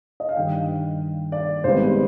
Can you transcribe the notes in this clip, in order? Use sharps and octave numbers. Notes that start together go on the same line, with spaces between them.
D#5
F5
G2 D#3 G3 G5
D5
G#1 G#2 G3 B3 C5